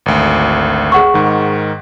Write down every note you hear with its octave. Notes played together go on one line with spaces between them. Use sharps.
G#1 D2
G#4 F#5 C#6
G#2 D#3